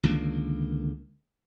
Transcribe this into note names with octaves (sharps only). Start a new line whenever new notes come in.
C#2 D3 D#3 A#3